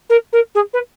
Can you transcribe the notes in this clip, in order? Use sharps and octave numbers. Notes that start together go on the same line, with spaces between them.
A#4
A#4
G#4
B4